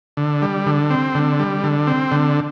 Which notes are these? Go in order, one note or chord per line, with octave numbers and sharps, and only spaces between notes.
D3
G3
D3
C4
D3
G3
D3
C4
D3